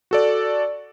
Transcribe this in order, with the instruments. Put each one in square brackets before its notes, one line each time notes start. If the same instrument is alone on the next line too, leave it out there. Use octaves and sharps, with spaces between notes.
[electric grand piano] F#4 A4 D5